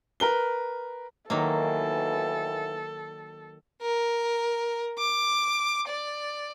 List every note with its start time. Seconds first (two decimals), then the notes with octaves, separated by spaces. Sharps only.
0.20 A#4 B4 G7
1.30 D#2 B2 D#3 E3 F#3 A#3 A4
3.82 A#4
4.98 D6
5.87 D5